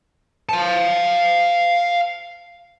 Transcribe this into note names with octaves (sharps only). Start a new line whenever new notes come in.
F5 A5